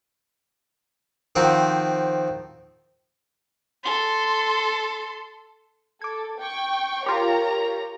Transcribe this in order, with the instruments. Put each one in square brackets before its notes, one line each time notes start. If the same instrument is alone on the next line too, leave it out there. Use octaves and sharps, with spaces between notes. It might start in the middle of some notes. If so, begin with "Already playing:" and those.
[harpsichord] D#3 F3 C4 F#4
[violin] A4 C6
[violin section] A4 [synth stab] D6 G#6
[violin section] G5 C#6
[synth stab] F4 G4 [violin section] A#4 C#5 A#5